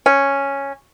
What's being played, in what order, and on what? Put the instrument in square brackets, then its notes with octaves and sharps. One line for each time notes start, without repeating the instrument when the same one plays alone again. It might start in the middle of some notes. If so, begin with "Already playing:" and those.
[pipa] C#4